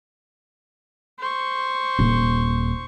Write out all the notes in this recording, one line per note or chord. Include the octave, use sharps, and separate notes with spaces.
C5 C#6
D#1